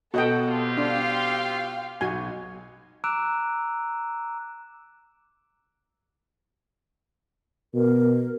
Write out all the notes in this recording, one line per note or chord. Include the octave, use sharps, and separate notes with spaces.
B2 F#4 A4 D#5 F#5 G5
C4 F4 G4
D4 F5 G5
B1 F#4 G#5
A#5 D6 E6 F#6 D7 E7
B2 A#4